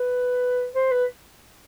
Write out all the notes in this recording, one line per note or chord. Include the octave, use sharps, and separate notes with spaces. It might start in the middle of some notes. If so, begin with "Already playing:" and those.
Already playing: B4
C5
B4